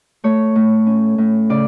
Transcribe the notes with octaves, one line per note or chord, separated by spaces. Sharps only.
A3 C#5
A2
C#4
A2
C#3 D5